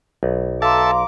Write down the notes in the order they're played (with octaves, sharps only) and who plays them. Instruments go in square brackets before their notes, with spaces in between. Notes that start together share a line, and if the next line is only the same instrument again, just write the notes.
[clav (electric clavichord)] B1
[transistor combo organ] A4 E5 A5 [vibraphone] F5 C6 [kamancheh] A#5 D6